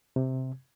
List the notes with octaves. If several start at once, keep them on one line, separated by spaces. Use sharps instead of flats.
C3